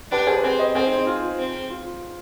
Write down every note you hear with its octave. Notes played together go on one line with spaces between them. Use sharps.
D4 G4 B4
G#4 C5
B4
C4 G#4 C5
C5 D#5
C4 G#4 C5
D#4
D#4
F4
F4
C4
F4